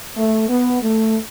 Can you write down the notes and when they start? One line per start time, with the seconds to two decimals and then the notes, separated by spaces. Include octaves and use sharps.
0.17 A3
0.49 B3
0.83 A3